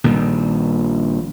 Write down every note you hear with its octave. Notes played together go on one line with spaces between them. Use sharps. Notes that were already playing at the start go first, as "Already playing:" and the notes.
A#1 A#2 D#3 G3